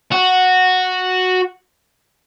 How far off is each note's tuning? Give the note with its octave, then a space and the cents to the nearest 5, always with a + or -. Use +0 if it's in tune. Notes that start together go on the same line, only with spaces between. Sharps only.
F#4 -5